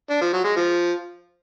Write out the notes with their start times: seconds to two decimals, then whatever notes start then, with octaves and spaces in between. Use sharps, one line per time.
0.10 D4
0.21 F3
0.33 F#3
0.44 G#3
0.56 F3